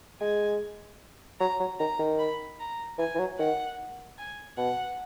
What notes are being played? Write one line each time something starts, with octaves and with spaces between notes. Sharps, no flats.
G#3 G#5
F#3 A#5
F#3
D#3 A#5
D#3
B5
A#5
E3 G#5
E3
F#3
D#3 F#5
G#5
B2 F#5